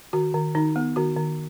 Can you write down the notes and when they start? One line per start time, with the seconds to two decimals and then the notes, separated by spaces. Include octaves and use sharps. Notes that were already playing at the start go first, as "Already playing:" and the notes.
0.13 D#3 F#4
0.34 D#3
0.55 D#3 D#4
0.76 B3
0.96 D#3 F#4
1.17 D#3